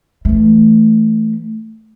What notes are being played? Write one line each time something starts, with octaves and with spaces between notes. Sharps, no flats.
E3 A3